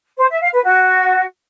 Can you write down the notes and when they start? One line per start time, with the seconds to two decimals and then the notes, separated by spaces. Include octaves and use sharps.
0.19 C5
0.30 E5
0.41 F5
0.53 B4
0.64 F#4